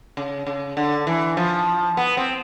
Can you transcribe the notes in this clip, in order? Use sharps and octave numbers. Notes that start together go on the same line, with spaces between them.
C#3
C#3
D3
E3
F3
B3
C4